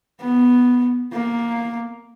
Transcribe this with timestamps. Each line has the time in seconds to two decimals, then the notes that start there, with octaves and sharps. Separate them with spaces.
0.21 B3
1.12 A#3